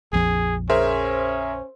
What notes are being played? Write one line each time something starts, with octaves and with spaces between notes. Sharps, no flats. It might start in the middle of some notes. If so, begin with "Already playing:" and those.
A#1 F2 F3 G#4
C#4 G#4 A#4 C5 E5